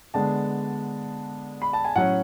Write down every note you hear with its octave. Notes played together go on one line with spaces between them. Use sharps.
D3 G#3 B3 D4 A5
B5
A5
G#5
A2 F#3 C#4 F#5